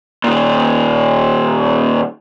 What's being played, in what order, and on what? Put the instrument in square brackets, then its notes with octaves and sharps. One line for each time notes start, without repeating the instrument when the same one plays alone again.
[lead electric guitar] A#2 D#3